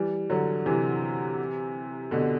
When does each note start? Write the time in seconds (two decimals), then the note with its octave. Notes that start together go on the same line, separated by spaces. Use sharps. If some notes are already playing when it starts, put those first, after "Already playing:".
Already playing: E3 G3
0.30 D3 F#3
0.66 C3 E3
2.11 B2 D3